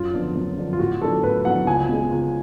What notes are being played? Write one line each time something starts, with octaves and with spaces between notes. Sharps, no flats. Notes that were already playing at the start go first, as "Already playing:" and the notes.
Already playing: F#2 F4
D3 F3 B3 D4
F#2
D3 F3 B3 D4
F4
A2 F#4
F#3 B3 D4 A4
A2 B4
F#3 B3 D4 F#5
C#2 G#5
B2 G#3
C#2